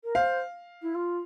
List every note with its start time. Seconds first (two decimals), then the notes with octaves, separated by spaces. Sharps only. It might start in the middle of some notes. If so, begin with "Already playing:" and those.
0.04 A#4
0.15 C5 F5
0.82 E4
0.95 F4